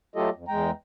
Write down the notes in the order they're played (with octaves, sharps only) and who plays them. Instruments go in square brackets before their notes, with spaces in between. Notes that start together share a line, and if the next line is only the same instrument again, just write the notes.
[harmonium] F#3 A3 F4 G4 A4 D#5
F2
E2 G#3 G5 A#5